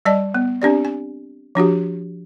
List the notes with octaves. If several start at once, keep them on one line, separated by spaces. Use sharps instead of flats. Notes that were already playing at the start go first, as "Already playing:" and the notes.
G3 D5 D#5 A5
B3
C4 D4 G4 D5
G#5
F3 D4 F#4 G4